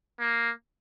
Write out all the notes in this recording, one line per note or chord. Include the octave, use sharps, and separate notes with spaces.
A#3